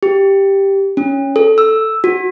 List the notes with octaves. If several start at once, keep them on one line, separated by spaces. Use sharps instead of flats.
G4
C#4
A4
E6
F#4